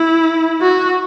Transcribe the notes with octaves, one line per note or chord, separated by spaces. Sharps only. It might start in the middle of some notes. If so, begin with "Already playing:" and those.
Already playing: E4
F#4